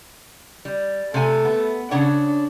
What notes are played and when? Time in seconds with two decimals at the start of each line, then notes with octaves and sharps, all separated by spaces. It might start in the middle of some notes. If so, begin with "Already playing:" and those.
0.65 G3
1.14 C3 A3 G#5
1.45 B3
1.91 C#3 D4 C#5 F#5